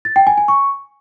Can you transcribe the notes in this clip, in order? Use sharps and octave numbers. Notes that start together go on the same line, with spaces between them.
A6
G5
G#5
G#5
C#6